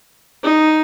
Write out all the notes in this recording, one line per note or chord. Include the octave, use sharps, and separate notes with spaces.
D#4